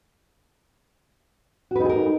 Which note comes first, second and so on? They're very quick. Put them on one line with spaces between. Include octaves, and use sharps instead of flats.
F#4 B4 D#4 G#4 A#4